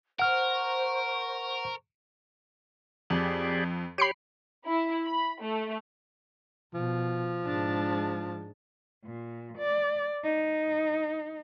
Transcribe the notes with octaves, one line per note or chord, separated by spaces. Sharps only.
A#4 C5 F#5 C#6 F6
F2 G4 G#4 D5
G4 C#5 B5 C7 D7
E4
B5
A3
B2 F3
G#2 G#3 D4 A5
A#2
D5
D#4